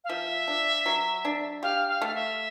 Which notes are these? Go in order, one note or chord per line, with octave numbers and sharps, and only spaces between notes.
F5
F3 E5
D4
F#3
D4
G4 F5
F5
A3 F5
E5